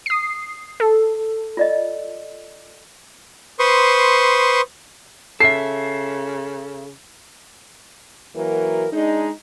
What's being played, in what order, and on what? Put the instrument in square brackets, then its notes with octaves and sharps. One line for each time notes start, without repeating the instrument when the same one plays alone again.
[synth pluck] D#6 C7
A4
[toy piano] F4 D5 D#5
[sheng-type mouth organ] B4 C5 C6 C#6 D#6
[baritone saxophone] C#3 [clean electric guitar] A4 E5 [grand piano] C7
[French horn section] E3 F#3 A#3 F#4 A#4
G#3 D4 D#4